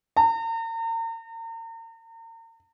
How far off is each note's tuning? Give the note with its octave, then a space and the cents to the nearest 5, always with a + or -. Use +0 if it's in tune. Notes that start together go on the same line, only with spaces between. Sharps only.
A#5 -40